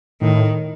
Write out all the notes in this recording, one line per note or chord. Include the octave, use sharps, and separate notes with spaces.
A2 D#3